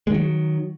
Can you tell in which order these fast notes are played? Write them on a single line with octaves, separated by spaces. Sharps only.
G#3 D#3 F#3